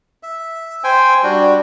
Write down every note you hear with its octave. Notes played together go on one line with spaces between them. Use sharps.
E5
C5 G5 G#5
G3 D4 F#4